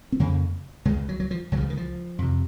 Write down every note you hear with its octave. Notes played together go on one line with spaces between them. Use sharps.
C4
F2 C#3 A#3
C#2 C#3 G#3
F#3
F#3
F3
C#2 F#3
C#3 F3
D#3
F3
F2 C3